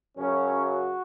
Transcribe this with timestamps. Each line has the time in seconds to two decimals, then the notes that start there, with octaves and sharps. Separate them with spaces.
0.17 F#2 C#3 F#3 C#4
0.66 F#4